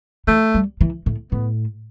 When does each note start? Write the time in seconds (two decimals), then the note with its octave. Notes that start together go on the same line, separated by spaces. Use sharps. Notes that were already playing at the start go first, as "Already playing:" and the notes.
0.27 E3 A3
0.54 G3
0.81 E3
1.06 A2
1.32 A2 B3